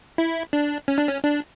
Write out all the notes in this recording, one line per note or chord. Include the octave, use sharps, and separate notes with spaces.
E4
D4
C#4
D4
C#4
D4